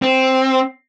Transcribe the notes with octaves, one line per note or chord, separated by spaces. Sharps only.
C4